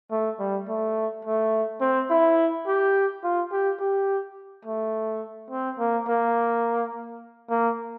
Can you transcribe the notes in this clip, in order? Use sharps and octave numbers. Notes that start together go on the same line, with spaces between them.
A3
G3
A3
A3
C4
E4
G4
F4
G4
G4
A3
C4
A#3
A#3
A#3